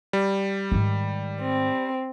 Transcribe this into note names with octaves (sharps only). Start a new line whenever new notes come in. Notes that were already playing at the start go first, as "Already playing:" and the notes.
G3
G#2 D#3
C4